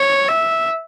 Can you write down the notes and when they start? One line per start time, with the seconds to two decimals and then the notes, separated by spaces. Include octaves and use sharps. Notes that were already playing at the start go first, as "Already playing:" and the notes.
Already playing: C#5
0.28 E5